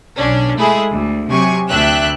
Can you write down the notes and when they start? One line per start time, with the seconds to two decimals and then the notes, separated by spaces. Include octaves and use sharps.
0.17 B1 C#4 D4
0.57 G#3 A3 E4 G#4
0.91 D2
1.29 C3 F#3 G#5 C#6
1.69 D2 D4 E5 G5 F#6